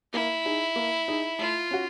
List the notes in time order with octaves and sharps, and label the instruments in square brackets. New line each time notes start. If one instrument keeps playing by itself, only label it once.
[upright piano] A#3 [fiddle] E4
[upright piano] D#4 G#4
A#3
D#4 G#4
[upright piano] A3 [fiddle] F4
[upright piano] C#4 F#4